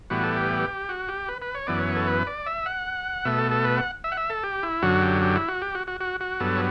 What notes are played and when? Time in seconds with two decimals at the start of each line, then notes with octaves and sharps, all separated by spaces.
0.10 A2 E3 G3 B3 F#4
0.24 A4
0.37 G4
0.89 F#4
1.08 G4
1.29 B4
1.42 B4
1.55 C#5
1.67 F#2 E3 B3 D5
1.80 C#5
1.97 A4
2.07 B4
2.27 D5
2.46 E5
2.66 F#5
3.25 B2 A3 E5
3.38 A4
3.52 A4
3.64 B4
3.77 F#5
4.04 E5
4.12 F#5
4.17 E5
4.30 A4
4.44 G4
4.63 E4
4.83 F#2 D3 F#3 F#4
5.02 G4
5.22 G4
5.35 E4
5.48 F#4
5.62 G4
5.75 F#4
5.87 F#4
6.01 F#4
6.20 F#4
6.40 G2 F#3 B3 A4
6.56 C#5